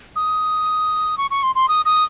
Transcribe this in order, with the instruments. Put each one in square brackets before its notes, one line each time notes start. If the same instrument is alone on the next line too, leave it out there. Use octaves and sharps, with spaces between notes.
[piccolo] D#6
C#6
C#6
C6
C6
D#6
D#6